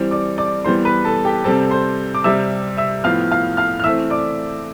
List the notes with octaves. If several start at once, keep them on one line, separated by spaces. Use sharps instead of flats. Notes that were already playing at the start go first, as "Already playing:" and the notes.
Already playing: E3 G3 C4
D5 D6
D5 D6
E3 G3 B3 C5 C6
B4 B5
A4 A5
G4 G5
C3 G3 C4 A4 A5
C5 C6
D6
C3 G3 C4 E5 E6
E5 E6
A2 F3 B3 F5 F6
F5 F6
F5 F6
F6
E3 A3 C4 E5 E6
D5 D6